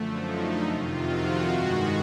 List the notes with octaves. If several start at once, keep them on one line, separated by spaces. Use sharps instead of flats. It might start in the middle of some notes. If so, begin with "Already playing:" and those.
Already playing: F#2 D3 F3 A3
D#4
F2 C3 D#3 F4
F#4
G2 D#3 G#3